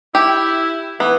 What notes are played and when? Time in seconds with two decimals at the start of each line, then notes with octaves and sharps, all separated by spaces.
0.15 E4 G4
1.00 E3 B3